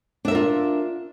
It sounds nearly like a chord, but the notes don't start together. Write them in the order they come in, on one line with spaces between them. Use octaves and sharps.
D4 E5 A#4 F4